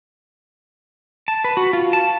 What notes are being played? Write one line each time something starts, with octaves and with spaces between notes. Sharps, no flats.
A5
B4
F#4
F4
A5